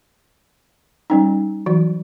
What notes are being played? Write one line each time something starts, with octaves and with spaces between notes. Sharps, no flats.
G3 C#4 D#4
E3 F#3 F#4